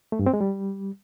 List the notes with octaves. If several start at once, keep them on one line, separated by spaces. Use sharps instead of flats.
A3
G2
C4
G#3
G3